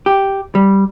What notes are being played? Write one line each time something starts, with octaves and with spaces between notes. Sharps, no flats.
G4
G3